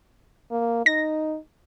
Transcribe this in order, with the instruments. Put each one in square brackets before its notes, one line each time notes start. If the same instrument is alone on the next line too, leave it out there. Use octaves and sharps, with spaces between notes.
[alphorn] A#3
[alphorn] D#4 [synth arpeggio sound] A#6